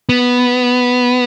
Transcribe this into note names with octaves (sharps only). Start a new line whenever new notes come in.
B3